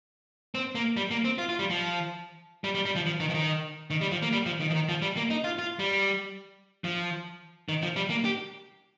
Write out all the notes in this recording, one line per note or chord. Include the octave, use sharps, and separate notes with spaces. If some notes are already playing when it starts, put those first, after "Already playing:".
C4
A#3
G3
A#3
C4
F4
F4
G3
F3
G3
G3
G3
F3
F3
D#3
F3
D#3
D#3
G3
F3
A#3
G3
F3
D#3
F3
D#3
F3
G3
A#3
D#4
F4
F4
G3
F3
D#3
F3
G3
A#3
G4